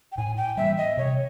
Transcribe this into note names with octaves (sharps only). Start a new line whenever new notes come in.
G5
A2 G#5
G5
E3 G3 B3 E5
D#5
C3 C#5